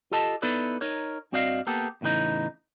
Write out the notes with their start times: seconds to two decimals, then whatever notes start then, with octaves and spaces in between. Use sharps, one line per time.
0.11 F4 G4 A4 D#5 A5
0.42 B3 D#4 E4 A4 B4 D5
0.81 D#4 A#4 C#5
1.32 G2 C4 F#4 D5 D#5 F5
1.67 A#3 B3 G4 A4
2.01 E2 A2 C#3 E3 D#4